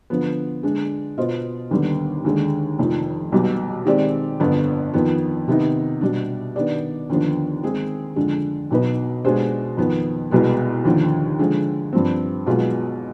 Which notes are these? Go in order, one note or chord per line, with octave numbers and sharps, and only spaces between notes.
D3 F3 B3
D3 G#3 D4
B2 B3 F4 C5 D#5
D#2 D3 G3 B3
D#2 D3 G#3
F1 F2 D#3
B1 B2 G3
D#3 G#3 C4 G4 D5
G1 F2 D3 F3 B3
F2 D#3 B3
C3 D#3 B3 D#4
B2 G3 D4
D#3 B3 D4 G4 D5
D#2 D3 F3 B3 D4
D#3 G#3 C4 D#4 G#4
F2 D3 G#3 D4
B1 B2 B3 D#4 B4
B2 G#3 D4 G4 C5
F2 D#3 B3
C2 B2 G#3 B3
D#2 D3 F3
D3 F3 G#3
G2 F3 C4
B1 B2 G#3 B3 F4